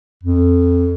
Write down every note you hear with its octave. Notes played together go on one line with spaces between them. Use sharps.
F2